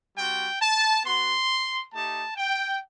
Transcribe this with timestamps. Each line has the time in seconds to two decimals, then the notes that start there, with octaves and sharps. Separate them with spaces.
0.16 G3 C4 F#4 G5
0.60 A5
1.04 B3 F#4 C6
1.92 A3 D#4 G4 A5
2.36 G5